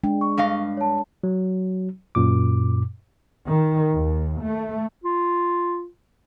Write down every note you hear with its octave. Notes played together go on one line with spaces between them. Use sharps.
G#3 D4 G5
C#6
G2 D#5 F5
C#5 A5
F#3
F#2 A#2 D6
D#3
D#2
A3
F4